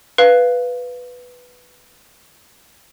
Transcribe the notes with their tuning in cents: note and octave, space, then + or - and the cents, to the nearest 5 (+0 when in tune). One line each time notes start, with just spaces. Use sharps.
B4 +0 F5 +0